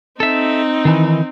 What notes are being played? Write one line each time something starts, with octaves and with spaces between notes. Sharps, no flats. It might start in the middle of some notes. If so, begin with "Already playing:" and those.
C4 D#4 A4 E5
D#3 E3